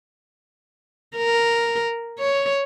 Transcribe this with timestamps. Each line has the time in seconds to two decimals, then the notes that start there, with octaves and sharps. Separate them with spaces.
1.15 A#4
2.19 C#5